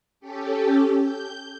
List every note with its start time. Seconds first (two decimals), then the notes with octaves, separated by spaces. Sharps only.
0.20 C#4 G4 A4
1.00 G6